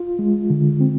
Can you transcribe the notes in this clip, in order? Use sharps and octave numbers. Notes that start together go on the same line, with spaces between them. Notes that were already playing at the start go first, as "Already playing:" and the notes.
Already playing: F4
G#3
D3
C4